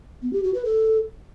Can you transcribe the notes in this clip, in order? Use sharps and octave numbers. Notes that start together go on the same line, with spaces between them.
B3
G4
F#4
B4
A4